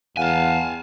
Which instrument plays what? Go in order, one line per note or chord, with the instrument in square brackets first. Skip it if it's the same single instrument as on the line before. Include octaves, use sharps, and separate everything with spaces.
[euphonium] E2 [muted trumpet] F5 [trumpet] F#5 [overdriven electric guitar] G#5 A5